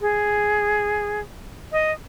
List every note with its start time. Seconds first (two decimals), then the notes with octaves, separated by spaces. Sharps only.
0.01 G#4
1.72 D#5